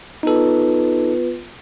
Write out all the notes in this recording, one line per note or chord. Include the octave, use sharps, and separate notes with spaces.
B3 D#4 F4 A4 B4